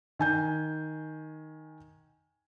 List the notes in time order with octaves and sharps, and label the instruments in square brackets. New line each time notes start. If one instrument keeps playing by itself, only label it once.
[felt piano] D#3 G#5 G6